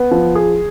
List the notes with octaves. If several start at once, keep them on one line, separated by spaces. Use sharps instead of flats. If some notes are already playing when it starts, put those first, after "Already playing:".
Already playing: B3
F3
G#4